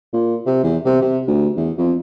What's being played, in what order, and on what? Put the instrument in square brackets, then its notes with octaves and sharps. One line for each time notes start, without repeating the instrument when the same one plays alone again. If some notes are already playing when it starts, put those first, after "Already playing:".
[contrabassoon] A#2
C3
E2
C3
C3
D2
E2
F2